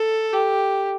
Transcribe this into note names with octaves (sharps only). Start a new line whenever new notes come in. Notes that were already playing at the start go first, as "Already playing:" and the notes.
Already playing: A4
G4